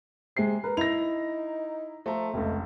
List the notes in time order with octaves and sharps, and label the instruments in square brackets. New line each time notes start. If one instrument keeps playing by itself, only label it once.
[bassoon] C3 [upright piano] G#3 C7
[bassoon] A#4 [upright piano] B4
[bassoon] D#4 [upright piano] E4 A#6 [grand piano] F7
[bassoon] F3 [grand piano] A3 A4 A#5
[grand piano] F1 C#2 [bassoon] A3